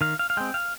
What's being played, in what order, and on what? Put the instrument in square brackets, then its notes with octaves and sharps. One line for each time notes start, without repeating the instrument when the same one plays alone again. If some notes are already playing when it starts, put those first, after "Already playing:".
[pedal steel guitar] D#3 F5
F5
F5
G#3 C4 G5
F5